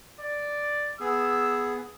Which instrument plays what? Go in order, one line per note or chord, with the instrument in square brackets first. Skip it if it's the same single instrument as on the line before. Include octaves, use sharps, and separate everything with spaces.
[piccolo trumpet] D5
[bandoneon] B3 G#4 [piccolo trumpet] E6